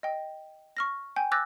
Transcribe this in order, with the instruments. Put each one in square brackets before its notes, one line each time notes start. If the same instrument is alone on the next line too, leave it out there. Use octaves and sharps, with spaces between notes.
[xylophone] D#5 G5
C#6 F6 A#6
G5 G#5 G6
D6 E6 F#6 G6 A6 A#6